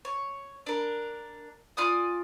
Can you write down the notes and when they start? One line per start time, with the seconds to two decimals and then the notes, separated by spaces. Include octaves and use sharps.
0.05 C#5
0.66 D4 A#4
1.77 F4 D5 G#5 D#6